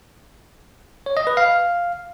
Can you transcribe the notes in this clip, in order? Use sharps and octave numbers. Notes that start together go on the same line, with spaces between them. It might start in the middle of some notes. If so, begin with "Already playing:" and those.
C#5
D#5
B4
F5